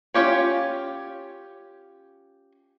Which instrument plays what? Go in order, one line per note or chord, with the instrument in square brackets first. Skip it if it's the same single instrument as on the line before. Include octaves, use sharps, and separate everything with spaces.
[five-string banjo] C#4 F4 G4 C#5